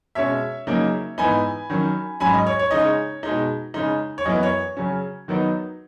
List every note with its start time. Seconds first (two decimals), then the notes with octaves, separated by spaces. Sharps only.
0.15 B2 G#3 C#4 C#5 E5
0.67 C#3 F#3 A#3 D#4
1.18 G#2 E3 B3 D#4 G#5 B5
1.70 D#3 F#3 C#4
2.20 G#2 F#3 C#4 G#5 B5
2.33 D#5
2.47 C#5
2.59 C#5
2.71 C#3 G#3 D#4 D#5
2.82 C#5
3.23 B2 G#3 D#4
3.74 C#3 G#3 D#4
4.18 C#5
4.25 F#2 E3 B3 D#5
4.43 C#5
4.77 C#3 F#3 C#4
5.28 D#3 F#3 B3 D#4